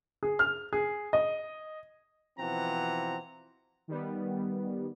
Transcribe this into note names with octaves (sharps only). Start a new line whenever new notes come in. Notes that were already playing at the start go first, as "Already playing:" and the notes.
G#4
F6
G#4
D#5
B2 E3 F3 C4 F#5 A#5
D#3 G3 B3